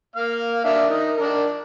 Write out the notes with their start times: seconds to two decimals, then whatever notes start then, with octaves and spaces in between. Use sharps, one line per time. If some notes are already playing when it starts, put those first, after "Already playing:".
0.16 A#3 F5 F6
0.64 D4 A#4 E5
0.90 D#4 A#4
1.17 D4 A#4